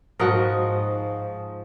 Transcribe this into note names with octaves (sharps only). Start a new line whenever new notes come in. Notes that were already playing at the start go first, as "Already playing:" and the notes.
G#2 F3 F#4 A#4 D#5